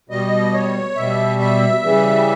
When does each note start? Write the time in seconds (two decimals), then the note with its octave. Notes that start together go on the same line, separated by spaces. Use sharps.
0.09 B2 G3 D#5
0.53 C#5
0.96 B2 G3 E5
1.39 E5
1.83 C#3 E3 G3